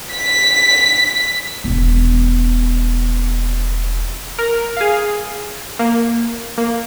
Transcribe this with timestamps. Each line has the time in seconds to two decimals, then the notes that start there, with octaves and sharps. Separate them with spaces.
0.12 B6
1.64 E1 B3
4.39 A#4
4.77 G#4 F5
5.79 A#3
6.58 A#3